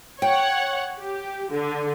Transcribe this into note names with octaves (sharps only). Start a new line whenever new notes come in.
C#5 F#5 G5
G4
D3